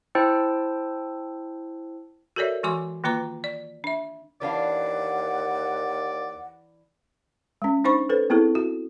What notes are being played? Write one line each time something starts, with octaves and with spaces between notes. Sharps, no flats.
E4 C5 G5 A5 E6
F#4 A4 A#4 C#5 D5 E5
E3 G#3 F#4 G#5 C6 D6
D#3 A#3 F4 B4 A#5 D6
D5
D4 E5
D#2 E3 D4 D5 F5 F#5
G#3 C#4
D4 D#4 C5 B5 C#6
A4 B4 C5
B3 C4 E4 G#4 A4
F#4